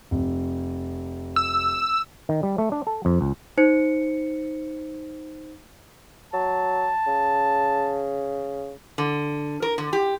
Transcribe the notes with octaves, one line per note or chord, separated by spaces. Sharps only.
F1
E6
D#3
G3
A3
D4
A4
F2
C#2
D#4 C5 C#7
F#3 A5
C#3
D3
A#4
D3
G4